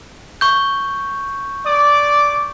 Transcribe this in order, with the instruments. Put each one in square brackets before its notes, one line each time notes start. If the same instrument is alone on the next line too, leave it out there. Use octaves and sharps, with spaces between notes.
[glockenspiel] C#6 G6
[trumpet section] D5 D6